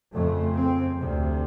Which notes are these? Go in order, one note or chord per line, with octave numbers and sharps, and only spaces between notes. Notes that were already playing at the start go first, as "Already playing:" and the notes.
F2 C#3 A3
C4
D2 C3